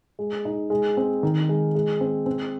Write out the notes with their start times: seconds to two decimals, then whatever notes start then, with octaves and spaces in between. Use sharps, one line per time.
0.19 G#3
0.45 D#4
0.70 G#3
0.97 C4
1.23 D#3
1.49 G#3
1.75 G#3
2.01 C4
2.26 C4